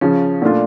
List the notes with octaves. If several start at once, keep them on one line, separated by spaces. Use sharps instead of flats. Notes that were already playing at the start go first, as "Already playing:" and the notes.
C#3 F3 C#4
A#2 A3 D4 F4